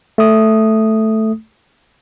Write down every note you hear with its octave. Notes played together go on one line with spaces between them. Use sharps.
A3 D#6